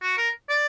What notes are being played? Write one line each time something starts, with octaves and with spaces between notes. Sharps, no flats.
F#4
A#4
D5